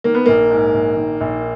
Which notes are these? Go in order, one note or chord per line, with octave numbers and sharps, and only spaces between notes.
D#3 A#3
B3
A#1 A#3
G#2
A#1
D#3
A#1